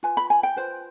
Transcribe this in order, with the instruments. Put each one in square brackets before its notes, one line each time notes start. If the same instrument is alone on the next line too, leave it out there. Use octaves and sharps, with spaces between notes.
[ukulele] F4 B4 G#5
B5
G#5
G5
F4 B4 C5